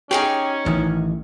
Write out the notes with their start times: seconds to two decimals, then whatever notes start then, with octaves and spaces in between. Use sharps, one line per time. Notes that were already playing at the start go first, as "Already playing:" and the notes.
0.11 C#4 D#4 G4 G#4 C#5
0.66 A1 D#3 E3